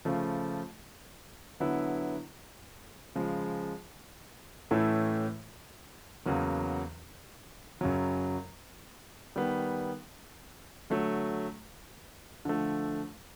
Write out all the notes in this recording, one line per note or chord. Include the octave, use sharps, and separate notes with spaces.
C#3 F3 A3
D3 F#3 B3 E4
C#3 F3 G#3
A2 E3 A3 C#4 E4
E2 C#3 F#3 A#3
F#2 C#3 F#3
D#3 G3 B3
D3 F#3 A3
D3 F3 A3